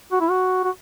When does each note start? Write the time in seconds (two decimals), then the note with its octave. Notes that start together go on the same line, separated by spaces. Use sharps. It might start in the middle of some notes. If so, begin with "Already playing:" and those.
0.12 F#4
0.20 E4
0.30 F#4
0.64 F#4